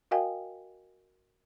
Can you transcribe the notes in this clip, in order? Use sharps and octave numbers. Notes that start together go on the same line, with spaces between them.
F#4 A#4 D#5 F5 G5 G#5